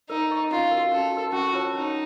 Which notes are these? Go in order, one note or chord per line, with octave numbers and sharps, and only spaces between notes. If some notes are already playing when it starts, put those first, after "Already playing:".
D#4 A#4
D#5 A#5 C#6
C#4 F4
F#4 A#4
C#4 A4
F#4 A#4
C#4 F#4
F4 A#4 C#5 A5
C#4 D#4